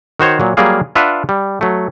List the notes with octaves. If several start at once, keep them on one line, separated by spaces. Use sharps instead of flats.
D#3 F#4 C5 C#5
A#2 F#3
F#3 G3 A#3 F4 G#4 F5
D4 F4 B4 E5 F#5
G3
F#3 A3